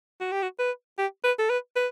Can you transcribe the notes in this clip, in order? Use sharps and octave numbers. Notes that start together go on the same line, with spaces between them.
F#4
G4
F#4
B4
G4
B4
A4
B4
B4